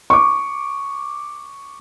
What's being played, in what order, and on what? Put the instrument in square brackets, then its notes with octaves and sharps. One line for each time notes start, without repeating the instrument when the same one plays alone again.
[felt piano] C#6 D6